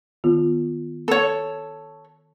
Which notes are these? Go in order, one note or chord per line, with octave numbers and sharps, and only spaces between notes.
D#3 B3 F4
A4 C#5